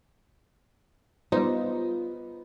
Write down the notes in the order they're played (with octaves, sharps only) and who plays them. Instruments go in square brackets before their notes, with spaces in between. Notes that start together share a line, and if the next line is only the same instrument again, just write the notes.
[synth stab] G3 C5 [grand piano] B3 [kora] D#4 [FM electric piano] F4